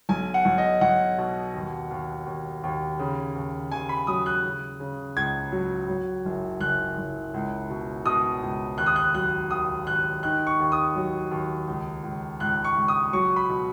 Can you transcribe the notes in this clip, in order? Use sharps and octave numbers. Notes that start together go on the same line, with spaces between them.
B1 G#5
F#5
B1
D#5
B1 F#5
B2
D#2
D#2
D#2
D#2
C#3
D#2
D#2 G#5
B5
F#3 D#6
F#6
C#3
C#3
C#2 G#6
F#3
F#3
F#1
F#1 F#6
F#1
C#2
B2
B2 D#6
C#2
D#2 F#6
D#6
F#6
F#3 F#6
D#2 D#6
D#2 F#6
D#3 F#6
C#6
D#2
D#6
F#3
D#2
C#2
C#2
C#2 F#6
C#6
C#2
D#6
F#3 C#6
B5
B2